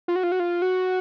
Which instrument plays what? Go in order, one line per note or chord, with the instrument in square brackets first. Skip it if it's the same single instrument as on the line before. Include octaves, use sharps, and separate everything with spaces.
[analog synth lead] F4
F#4
F4
F#4
F4
F#4